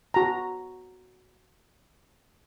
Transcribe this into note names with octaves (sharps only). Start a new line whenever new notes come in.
F#4 A#5